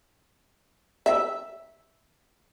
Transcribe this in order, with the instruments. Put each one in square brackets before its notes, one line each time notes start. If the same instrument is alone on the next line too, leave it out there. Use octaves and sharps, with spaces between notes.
[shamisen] E5